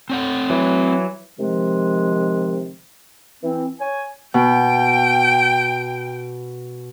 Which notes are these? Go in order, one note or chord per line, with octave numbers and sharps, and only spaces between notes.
C4 C#5 F#5
E3 F#3
C3 D#3 F3 G#3
E3 C4
C#5 G#5
B2 G5